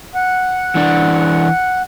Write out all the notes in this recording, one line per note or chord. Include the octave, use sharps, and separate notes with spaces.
F#5
E3 D4